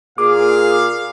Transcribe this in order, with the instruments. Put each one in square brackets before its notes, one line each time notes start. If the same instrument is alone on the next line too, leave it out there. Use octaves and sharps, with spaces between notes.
[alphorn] A#2 [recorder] G#4 [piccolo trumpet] F5 [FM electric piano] D6